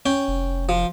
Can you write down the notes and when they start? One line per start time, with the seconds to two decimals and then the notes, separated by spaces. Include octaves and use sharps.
0.06 C#4 G5
0.28 F1
0.69 F3